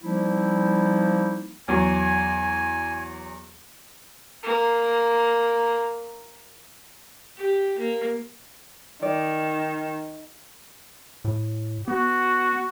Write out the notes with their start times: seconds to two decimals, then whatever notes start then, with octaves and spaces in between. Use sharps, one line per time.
0.02 F3 G3 A#3 C4 D#4 E4
1.68 E2 F#3 G#5
4.43 A#3 A#4
7.37 G4
7.78 A#3
9.03 D#3 D5
11.25 A2
11.88 B3 F#4